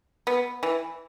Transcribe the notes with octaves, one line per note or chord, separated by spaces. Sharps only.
B3
E3